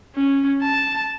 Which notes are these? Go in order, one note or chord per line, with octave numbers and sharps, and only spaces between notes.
C#4
A5